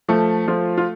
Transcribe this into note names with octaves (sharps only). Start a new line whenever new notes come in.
F3 A3 A4
F3 A3 F4
F4